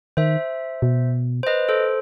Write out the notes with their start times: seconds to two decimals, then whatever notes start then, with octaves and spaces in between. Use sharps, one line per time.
0.17 D#3 C5 E5
0.82 B2
1.43 C5
1.47 B4 D#5
1.69 A4 C5